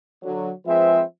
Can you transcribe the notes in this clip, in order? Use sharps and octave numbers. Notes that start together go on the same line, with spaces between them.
D3 F#3
F3 G#3 C4 G#4 B4 E5